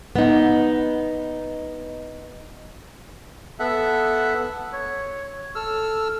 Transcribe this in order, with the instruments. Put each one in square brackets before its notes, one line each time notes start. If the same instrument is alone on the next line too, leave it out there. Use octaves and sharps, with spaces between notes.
[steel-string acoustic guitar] B3 D#4
[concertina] B3 A4 E5 F#5
C#5
A4 E6 F6